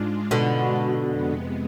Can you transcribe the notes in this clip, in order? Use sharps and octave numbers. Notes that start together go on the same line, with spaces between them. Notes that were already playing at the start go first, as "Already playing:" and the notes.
Already playing: G#2 G#3 D4 F4
B2 D3
F2 C3 G#3 B3